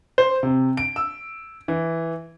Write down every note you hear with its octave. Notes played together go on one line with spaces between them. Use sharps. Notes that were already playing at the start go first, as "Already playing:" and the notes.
C5
C3
D7
E6
E3